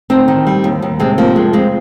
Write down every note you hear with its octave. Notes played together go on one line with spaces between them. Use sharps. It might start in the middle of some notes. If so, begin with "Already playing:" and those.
D2 C4 D#4
D#3
G3
D#2
D#2
C3 G#3 C4
F3 A#3
F2 G#3
F2 G#3 C4